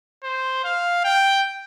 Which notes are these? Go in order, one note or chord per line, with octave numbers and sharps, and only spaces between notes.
C5
F5
G5